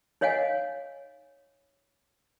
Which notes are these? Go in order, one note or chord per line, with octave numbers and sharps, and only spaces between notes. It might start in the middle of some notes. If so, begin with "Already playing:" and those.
D#4 C#5 D#5 F5 F#5 G#5